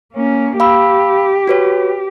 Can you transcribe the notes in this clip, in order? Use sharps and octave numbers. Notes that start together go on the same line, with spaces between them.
A#3 C#4
G4 F5 B5 E6
F#4 B4 C#5